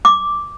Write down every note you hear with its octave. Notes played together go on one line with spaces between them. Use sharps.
D6